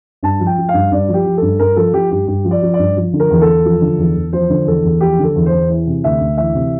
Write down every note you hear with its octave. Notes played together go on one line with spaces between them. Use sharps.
G2 A5
F3
G5
F3
F5
G2
G2 D5
F3
G4
F3
G2 A4
G2 A#4
F3 A4
F3 G4
G2 G4
G2 G4
F3
D5
F3
D5
G2
F3
D3
A#4
E2
A4
E2
F3
D3
E2
E2
F3 C5
D3
E2 A4
E2
F3 G4
D3
A4
E2
C5
E2
E3
C3
D2 E5
D2
E3 E5
C3